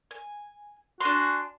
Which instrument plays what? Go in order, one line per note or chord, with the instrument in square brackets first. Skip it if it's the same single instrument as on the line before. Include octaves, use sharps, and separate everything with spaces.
[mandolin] G#5
[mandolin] D4 G#5 C6 [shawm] F#4